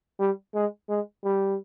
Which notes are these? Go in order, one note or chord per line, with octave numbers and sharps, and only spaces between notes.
G3
G#3
G#3
G3